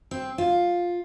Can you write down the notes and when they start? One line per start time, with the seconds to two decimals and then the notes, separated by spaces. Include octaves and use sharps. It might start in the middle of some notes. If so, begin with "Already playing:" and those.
0.11 C4
0.38 F4